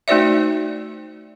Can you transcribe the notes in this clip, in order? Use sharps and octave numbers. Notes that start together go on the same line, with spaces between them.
A3 D#4 F#4 C5 D5 E5